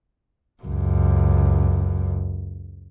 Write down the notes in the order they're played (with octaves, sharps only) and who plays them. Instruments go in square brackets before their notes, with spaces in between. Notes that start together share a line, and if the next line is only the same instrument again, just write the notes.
[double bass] C#2 F#2